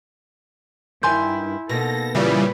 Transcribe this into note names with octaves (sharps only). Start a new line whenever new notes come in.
G2 D#3 E4 G#5 C6 G6
B2 A#3 D#4 A4 A#6
A#2 C#3 E3 G3 F4 B4 D5